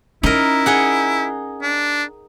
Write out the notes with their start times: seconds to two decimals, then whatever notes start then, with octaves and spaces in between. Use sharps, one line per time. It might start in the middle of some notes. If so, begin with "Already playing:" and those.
0.23 C#4 D#4 E4 A#4
0.66 D#4 G#4 F#5
1.62 D4